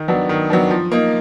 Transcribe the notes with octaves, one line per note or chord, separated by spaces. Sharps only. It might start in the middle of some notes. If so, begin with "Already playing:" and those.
Already playing: D#3
F#3 B3 D4
D#3
F#3 B3 D4
F3
A#3 D#4